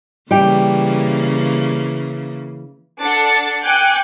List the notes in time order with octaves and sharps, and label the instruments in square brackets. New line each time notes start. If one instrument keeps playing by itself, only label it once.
[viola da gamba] C#3 E3 A#3 [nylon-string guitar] G3 G5
[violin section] D4 A4 F#5 A6 C#7
G5 G#5 D6 F#6 G6 C#7